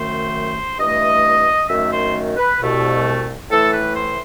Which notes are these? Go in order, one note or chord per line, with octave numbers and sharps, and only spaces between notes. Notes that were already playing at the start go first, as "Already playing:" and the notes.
Already playing: F#2 D#3 A3 C5
G2 E3 A3 D#5
F#2 D#3 A3 E5
C5
B4
C2 B2 A3
A2 E3 A3 A4
B4
C5